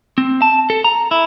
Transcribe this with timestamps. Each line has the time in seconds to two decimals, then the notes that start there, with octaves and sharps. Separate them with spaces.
0.18 C4
0.42 A5
0.70 A4
0.84 A#5
1.11 E4